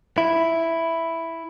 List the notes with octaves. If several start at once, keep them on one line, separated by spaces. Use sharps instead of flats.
E4